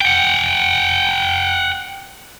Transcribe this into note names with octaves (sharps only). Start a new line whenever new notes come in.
F#5 G5